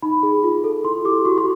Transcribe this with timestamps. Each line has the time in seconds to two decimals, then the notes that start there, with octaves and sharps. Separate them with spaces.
0.02 D#4 B5
0.23 G#4
0.43 F4
0.64 A4
0.84 E4 C6
1.05 G4 D6
1.25 F#4 C#6
1.38 C6